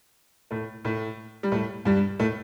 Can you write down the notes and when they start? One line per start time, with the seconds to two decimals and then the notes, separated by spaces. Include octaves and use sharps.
0.51 A2 A3
0.85 A2 A3
1.43 G3
1.52 A2 A3
1.85 G2 G3
2.20 A2 A3